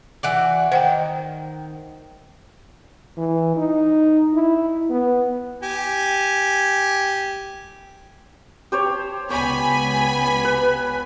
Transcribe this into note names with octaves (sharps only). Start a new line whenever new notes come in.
E3 F#4 D5
D#3 C5 F#5 G5
E3
D#4
E4
B3
G4 G#5
G4 C5 C#5
C#2 B3 C#5 G#5 B5
B4